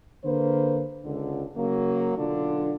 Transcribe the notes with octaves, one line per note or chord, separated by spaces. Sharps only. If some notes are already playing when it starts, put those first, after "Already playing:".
D3 A#3 B4 C5
C#2 D3
C#3 F#3 A#3
B1 D3 D4 F4